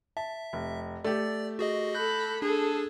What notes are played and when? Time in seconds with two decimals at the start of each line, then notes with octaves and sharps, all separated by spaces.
0.17 E5 A5
0.53 F1
1.04 A3 G4 D5 A6
1.59 F#4 G#4 D#5
1.95 A4 B5 F#6 G6 A#6
2.42 D4 G#4 A4